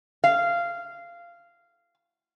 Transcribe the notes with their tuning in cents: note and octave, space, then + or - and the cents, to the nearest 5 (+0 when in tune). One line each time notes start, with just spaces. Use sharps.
F5 -15